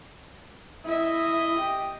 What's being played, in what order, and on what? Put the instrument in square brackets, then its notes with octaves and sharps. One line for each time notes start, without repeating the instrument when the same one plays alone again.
[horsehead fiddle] E4 E5 [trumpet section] D#5
[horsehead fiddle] G4